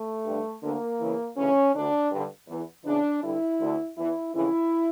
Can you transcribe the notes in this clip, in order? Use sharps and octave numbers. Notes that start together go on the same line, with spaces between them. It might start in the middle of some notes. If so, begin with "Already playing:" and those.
Already playing: A3
G2 D3
D2 D3 A#3
E2 C#3 E3
D2 C#3 E3 C#4
D2 D3 D4
G2 D3
E2 E3
E2 C#3 E3 D4
G2 D3 E4
D2 D3
E2 E3 E4
F2 C#3 E3 E4